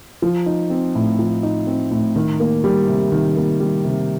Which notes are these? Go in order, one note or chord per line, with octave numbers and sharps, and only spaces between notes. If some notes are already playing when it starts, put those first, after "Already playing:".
F3
D#4
C4
A2
F3
D#4
C4
A2
D#3
A#3
G3
C3
D#3
A#3
G3
C3